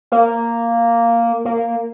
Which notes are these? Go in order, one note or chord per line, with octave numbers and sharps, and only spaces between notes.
A#3
A#3